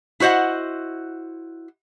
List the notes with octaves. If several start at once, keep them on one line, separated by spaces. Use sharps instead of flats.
E4 F#4 C5 D#5 F#5